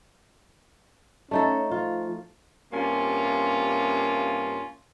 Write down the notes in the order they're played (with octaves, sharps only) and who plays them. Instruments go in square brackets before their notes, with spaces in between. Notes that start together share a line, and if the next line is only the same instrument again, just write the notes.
[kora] A3 D#4 A4 [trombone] C#4
[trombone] F3 [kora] F4
[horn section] G2 C3 A#3 C#4 F4